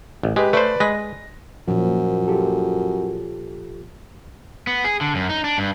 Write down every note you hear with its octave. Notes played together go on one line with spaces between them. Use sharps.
A1
G#3 G4 B4
A3 B4 C5 D5
G#3 B4 A#6
F#2 A#2 F3
F4 G4 A4
B3
G#4
D3
F#2
D#4
D4
G2